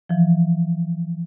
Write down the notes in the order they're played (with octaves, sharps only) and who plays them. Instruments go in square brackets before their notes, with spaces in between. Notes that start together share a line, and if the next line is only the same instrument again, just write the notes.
[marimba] E3 F3